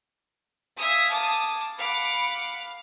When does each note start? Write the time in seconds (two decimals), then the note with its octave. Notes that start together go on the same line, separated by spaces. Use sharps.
0.78 E5 F5 G#5 D#6
1.11 A5 D6
1.78 F5 F#5 B5 D6